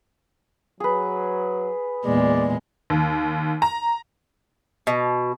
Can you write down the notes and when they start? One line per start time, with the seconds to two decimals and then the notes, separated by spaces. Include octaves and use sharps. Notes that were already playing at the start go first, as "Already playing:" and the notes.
0.80 F#3 G#4 B4
2.05 E2 A#2 G#3 D5
2.90 D#2
3.62 A#5
4.87 B2